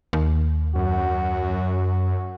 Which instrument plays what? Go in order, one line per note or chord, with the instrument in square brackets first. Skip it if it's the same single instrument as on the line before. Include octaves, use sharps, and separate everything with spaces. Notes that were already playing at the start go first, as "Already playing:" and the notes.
[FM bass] D#2
[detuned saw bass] F#2 [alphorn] F#4